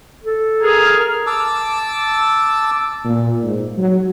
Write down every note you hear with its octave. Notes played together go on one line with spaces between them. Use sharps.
A4
G#4 A#4 F6
A5 D6 E6
A#2
G#2
F#3